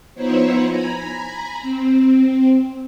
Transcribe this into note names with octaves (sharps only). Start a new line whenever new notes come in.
F3 B3 D#4 E4 C5 C#5
G#5 A#5 B5
C4